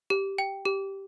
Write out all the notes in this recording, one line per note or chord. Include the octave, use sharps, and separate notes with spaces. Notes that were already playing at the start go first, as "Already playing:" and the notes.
G4
G5
G4